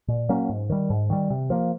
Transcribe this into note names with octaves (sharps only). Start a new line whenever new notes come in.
A#2
F#3 A#3 C#4
G#2
D#3 G3
G#2
D#3 G3
C3
F3 A#3